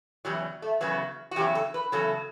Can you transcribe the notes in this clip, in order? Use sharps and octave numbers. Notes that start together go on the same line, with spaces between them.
E2 C#3 F#3 G3
A3
E2 C#3 F#3 B3
F#4
E2 C#3 F#3 G4
A4
B4
E2 C#3 F#3 A4